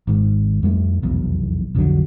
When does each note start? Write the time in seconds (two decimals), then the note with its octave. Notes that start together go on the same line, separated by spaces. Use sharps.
0.07 G#1 G#2
0.63 F2 G3 A3
1.02 F1 B1 E2
1.75 B1 F2 D3 F#3